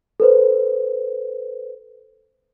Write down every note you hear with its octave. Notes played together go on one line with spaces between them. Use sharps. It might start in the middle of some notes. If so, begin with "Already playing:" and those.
A4 B4 C5